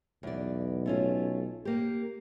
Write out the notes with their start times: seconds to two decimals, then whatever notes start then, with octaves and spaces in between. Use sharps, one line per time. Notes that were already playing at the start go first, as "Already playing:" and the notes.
0.23 B1 E2 D5
0.86 A3 C#4 F4
1.65 A#3 G4